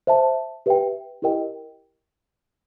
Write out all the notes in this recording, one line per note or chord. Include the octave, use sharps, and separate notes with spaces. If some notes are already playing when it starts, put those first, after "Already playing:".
C5 E5 A5
G4 B4 E5 G5
E4 G4 A#4 D#5 G5